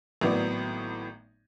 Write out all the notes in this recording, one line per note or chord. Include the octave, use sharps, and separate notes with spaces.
G#1 A2 F#3 B3 D5